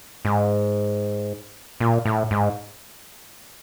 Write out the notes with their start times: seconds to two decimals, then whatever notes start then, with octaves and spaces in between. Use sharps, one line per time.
0.25 G#2
1.80 A#2
2.05 A2
2.31 G#2